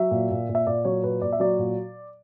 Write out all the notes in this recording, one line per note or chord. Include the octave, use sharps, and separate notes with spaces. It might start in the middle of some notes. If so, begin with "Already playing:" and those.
Already playing: F#3 E5
A#2
A#2
A#2
E5
A#2 D5
F#3 C#5
A#2 B4
A#2 D5
E5
F#3 D5
A#2